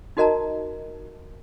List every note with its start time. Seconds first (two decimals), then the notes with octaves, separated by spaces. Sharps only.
0.17 D#4 F#4 A#4 D#5 A5 A#5